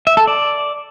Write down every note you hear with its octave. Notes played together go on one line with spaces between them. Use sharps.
E5
A4
D5